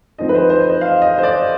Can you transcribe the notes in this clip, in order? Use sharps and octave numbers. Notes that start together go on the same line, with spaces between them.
F3 C4 D#4 D#5
B4
C5
C5
D#5
F5
D#5
C5
D5